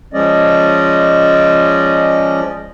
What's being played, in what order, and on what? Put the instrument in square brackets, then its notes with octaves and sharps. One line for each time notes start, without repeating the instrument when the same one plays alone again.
[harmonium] F3 G#3 C#4 D5 D#5